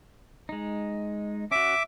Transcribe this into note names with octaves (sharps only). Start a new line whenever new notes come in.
G#3 D#4
C#4 F#4 E5 D6